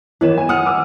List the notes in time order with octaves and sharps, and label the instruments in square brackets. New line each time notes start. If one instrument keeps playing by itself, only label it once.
[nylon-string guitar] D#3 B3 [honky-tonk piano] E3 C#5 E7
[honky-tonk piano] G#5
[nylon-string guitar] F#5 [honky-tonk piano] D#6 F6 D#7
[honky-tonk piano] D6 E6